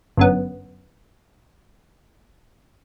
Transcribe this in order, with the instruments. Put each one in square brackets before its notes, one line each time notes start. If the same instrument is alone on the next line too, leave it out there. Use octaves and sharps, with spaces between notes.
[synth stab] G1 F#2 B3